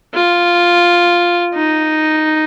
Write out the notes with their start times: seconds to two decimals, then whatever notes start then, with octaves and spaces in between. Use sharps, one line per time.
0.14 F4
1.54 D#4